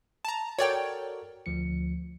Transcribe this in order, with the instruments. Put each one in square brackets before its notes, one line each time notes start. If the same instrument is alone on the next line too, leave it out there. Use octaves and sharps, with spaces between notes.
[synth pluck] A5 A#5
[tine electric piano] F#4 A4 A#4 [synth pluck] C#5 D5 G5
[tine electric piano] D2 F3 C#7